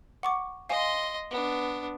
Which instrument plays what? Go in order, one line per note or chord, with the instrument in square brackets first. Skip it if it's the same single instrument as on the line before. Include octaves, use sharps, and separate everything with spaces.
[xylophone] F#5 C#6 D6
[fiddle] D#5 C6 [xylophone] F5 G#5
[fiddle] B3 D4